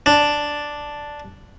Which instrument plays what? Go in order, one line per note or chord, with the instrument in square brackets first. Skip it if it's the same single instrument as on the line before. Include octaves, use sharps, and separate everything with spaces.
[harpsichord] D4